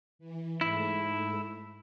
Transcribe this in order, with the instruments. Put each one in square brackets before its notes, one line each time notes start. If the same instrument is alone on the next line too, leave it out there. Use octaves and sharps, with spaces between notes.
[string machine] E3
[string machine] G#2 A3 [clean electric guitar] E4